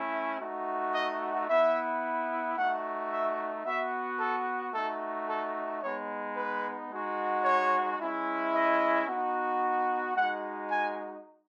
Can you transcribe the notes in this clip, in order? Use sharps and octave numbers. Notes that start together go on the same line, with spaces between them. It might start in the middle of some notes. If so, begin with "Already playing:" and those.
Already playing: A3 C#4 E4
A3 D#4 F#4
D#5
B3 E4 E5
A3 D#4 F#4 F#5
E5
B3 F#4 E5
A4
A3 D#4 F#4 A4
A4
G#3 B3 D#4 C#5
B4
G#3 D#4 F#4
C#5
G#3 C#4 E4
D#5
B3 D#4 F#4
G#3 D#4 F#4 F#5
G#5